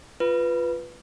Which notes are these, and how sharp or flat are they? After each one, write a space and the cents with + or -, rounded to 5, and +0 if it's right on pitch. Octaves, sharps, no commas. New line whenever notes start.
F4 +0 B4 +0